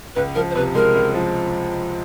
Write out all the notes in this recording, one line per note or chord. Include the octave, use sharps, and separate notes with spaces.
C#2 B4
F3 A#4
C5
C3 B4
G#3 A#4
C#2
F3